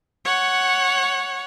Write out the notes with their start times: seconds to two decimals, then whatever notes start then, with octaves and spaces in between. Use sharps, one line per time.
0.25 C#5 F#5